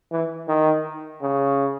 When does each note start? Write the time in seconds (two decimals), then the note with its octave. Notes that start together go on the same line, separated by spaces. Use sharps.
0.12 E3
0.48 D#3
1.22 C#3